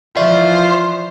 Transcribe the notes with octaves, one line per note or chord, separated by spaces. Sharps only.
E3 F3 F4 C5 D5 E5 C#6